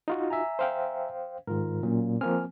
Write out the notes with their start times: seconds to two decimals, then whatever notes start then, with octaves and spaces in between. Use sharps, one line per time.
0.08 D#4 F4 F#4
0.30 E5 G#5 A#5
0.59 C5 F5 G5
1.47 G#2 D#3 F4 A#4
1.83 A#2 F#3 A#3 C#4
2.21 F3 A#3 C4 G#5 F6